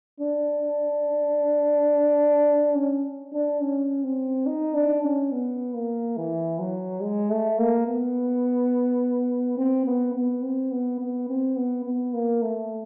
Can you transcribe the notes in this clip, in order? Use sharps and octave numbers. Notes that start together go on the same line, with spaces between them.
D4
C#4
D4
C#4
C4
D#4
D4
C#4
B3
A#3
E3
F#3
G#3
A3
A#3
B3
C4
B3
B3
C4
B3
B3
C4
B3
B3
A#3
A3